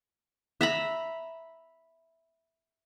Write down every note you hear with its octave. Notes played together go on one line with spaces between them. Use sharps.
E5 A#5 B5